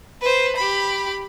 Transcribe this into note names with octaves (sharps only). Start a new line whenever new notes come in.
B4 C5
G4 B5